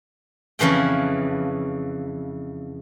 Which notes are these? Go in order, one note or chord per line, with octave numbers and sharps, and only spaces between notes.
F2 C#3 E3 G#4 G5